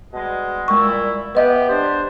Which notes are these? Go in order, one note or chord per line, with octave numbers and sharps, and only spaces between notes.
B2 G3 G#3
A#2 G3 G#3 E4 C#6
B3 G4 B4 D#5 E5
G3 D4 C5